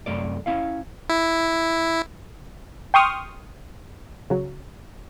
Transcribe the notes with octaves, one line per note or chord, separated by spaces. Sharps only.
C2 F#2 A3 D5
C#4 E4 F5
E4
G5 C6 C#6 D#6 F6
C#3 F#3